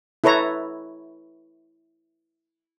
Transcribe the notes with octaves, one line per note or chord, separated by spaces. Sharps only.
E4 A4 B4 C#5 A#5